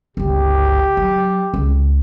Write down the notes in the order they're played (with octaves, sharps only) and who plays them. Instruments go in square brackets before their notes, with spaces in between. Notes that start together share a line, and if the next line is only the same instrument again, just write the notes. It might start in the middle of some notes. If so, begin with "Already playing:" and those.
[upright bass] G1 C#2 [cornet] G4
[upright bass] F#3
C#2